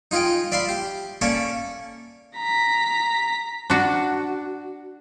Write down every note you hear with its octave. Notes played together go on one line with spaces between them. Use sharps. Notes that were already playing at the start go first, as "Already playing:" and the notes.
D#4 F4 G#4 D#5 G5
D5 E5 F5 B5 C6
G4
A#3 C#4 A4 D5 E5
A#5 B6
D4 F#4